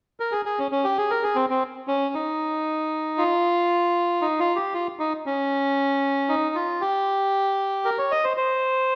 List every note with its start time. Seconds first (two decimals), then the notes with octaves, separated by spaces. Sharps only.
0.20 A#4
0.32 G#4
0.46 G#4
0.59 C#4
0.71 C#4
0.84 G4
0.98 G#4
1.11 A#4
1.23 G#4
1.36 C4
1.50 C4
1.88 C#4
2.15 D#4
3.18 F4
4.22 D#4
4.40 F4
4.56 G4
4.74 F4
4.99 D#4
5.26 C#4
6.29 D#4
6.55 F4
6.81 G4
7.85 A#4
7.98 C#5
8.11 D#5
8.24 C5
8.37 C5